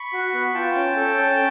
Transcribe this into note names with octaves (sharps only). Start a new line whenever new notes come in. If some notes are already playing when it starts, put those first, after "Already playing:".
Already playing: B5 C#6
F#4
B3
F4 G5 A5
C#4
A4
C#4